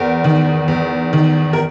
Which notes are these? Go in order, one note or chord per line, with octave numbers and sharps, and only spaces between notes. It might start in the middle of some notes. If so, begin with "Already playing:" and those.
Already playing: E2 A#4
D#3
E2
D#3
A#4